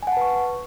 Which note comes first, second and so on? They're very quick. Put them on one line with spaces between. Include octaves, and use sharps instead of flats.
G#5 F#5 A5 B4 C#6